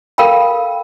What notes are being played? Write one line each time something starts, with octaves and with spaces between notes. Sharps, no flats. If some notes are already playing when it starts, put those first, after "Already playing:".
A4 A#4 F5 G5 B5